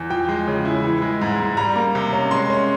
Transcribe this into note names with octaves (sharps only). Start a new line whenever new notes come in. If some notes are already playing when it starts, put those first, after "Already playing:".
Already playing: E2
F3 G5
G#3
C#3
E4
E3
G#3
G#2
G#2
G3 A#5
A#3
C3
C#4
G#3 C6
C#4